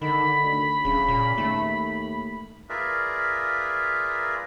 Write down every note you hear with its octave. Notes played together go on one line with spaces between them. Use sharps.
D3 D#3 B5
D2
D1 C#3
A#2
D#2 A3
F4 G#4 A#4 B4 D5 E5